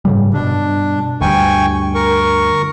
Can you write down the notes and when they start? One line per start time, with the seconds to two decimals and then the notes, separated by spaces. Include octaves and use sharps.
0.05 G#2 C#3 G3
0.33 G2 B2 D4
1.21 D2 G2 G5 G#5 C#6
1.95 A#4 C#6